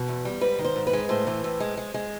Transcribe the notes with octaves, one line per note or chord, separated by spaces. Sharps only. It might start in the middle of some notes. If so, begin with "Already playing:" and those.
Already playing: B2
E2
G3
G#2 B4
D#3
C5
G#2
B4
G#3
A2 C5
E3
A2
G#3
G#3
G#3